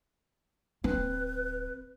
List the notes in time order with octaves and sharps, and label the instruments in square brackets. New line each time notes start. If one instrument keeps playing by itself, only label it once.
[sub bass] D1 [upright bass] C4 [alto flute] B4